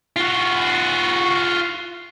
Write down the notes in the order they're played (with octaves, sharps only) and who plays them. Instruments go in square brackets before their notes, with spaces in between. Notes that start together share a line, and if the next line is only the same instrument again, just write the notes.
[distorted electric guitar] F4 F#4